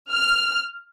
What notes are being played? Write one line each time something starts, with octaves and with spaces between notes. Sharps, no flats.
F6